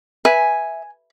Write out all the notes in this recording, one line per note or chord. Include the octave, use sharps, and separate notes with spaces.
B4 E5 G#5